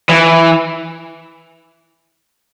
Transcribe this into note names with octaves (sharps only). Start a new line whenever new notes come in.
E3